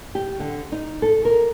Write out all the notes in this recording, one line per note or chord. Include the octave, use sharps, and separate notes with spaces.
G4
D3
D#4
A4
A#4